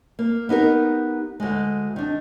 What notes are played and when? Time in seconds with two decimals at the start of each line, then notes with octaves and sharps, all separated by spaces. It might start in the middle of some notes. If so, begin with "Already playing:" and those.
0.19 A#3
0.49 B3 D#4 G4 A#4
1.40 D2 G#3
1.96 D#3 D4